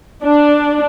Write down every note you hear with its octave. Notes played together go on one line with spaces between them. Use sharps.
D4